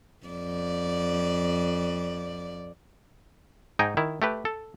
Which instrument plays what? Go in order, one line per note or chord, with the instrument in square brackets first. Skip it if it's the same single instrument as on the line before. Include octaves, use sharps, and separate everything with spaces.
[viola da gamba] F2 D5
[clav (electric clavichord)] G#2 D#4 D#5 G5 G#5
D#3 E4
A3 G4 B4
A4